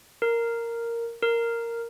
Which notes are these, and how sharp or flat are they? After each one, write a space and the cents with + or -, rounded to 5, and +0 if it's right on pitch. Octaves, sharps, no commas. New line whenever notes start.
A#4 -5
A#4 -5